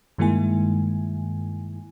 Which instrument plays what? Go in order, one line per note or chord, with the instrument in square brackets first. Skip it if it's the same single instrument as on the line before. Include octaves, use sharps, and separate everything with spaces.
[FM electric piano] G2 D#3 G#3 A#3 E4 G#5